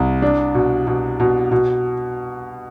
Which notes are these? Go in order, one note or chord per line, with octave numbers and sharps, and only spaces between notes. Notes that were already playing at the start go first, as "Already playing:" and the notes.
Already playing: C2
D4
B2
B2
B2
B2